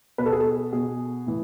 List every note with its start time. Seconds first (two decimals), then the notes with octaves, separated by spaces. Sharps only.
0.18 B2 B4
0.26 A4
0.32 G#4
0.40 A4
0.72 B2 G#4
1.27 A2 E3